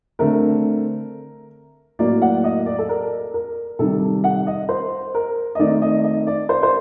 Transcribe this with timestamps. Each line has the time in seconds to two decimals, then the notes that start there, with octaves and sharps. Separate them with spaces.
0.19 D3 A3 C4 A#4
1.99 A2 F#3 A#3 D5
2.22 F#5
2.44 D#5
2.66 D5
2.79 A4
2.89 A#4
3.34 A#4
3.79 C3 D#3 G3 A4
4.24 F#5
4.47 D#5
4.69 C5
5.14 A#4
5.55 D#5
5.59 D#3 A3 C4 D5
5.82 D#5
6.04 D#5
6.27 D5
6.49 C5
6.63 C5